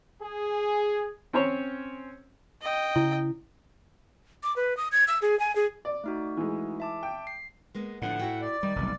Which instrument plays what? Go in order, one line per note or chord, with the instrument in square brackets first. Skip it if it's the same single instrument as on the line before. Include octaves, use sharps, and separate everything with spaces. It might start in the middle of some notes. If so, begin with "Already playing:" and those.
[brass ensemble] G#4
[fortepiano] C4 C#4 C5 C#5
[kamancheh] D#5 G5
[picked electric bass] C#3 [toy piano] E4
[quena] D6
B4
D#6
G#6
E6
G#4
G#5
G#4
[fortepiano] D5
[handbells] A3 D#4 F#4
[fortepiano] E3 G#3
[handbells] E5 A5 D6
[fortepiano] G5
[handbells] C7
[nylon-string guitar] G#3 A#3 B3
[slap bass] A2 [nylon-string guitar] D3 F3 D4 [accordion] F#5
[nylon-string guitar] E4 F#4 G5
[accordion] D5
[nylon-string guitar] D#3 [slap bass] G3
[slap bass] F1 B1 G3